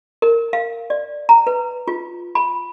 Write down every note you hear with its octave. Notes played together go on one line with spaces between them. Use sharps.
A#4
F5
D5
A#5
B4
F4
B5